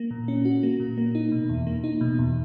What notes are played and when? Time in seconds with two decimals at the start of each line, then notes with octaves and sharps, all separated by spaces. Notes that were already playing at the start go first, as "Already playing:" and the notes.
Already playing: A#3
0.11 A#2
0.28 C#4
0.45 F#4
0.63 A#3
0.80 A#2
0.98 A#3
1.15 D#4
1.32 B2
1.49 E2
1.67 A#3
1.84 D#4
2.01 B2
2.18 E2